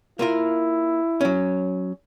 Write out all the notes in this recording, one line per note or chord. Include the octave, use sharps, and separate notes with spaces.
A#3 E4 F4 A#4
F#3 C#4